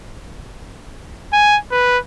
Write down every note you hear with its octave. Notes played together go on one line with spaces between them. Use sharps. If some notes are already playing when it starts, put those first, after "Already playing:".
G#5
B4